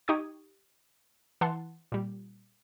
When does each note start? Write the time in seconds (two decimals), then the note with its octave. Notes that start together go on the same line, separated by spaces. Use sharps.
0.08 D#4 G4 C#6 D#6 G#6
1.41 E3 F#5 A5 C6
1.92 A#2 G3